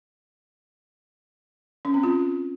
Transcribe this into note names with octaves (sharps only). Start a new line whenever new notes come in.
C#4
C4
F4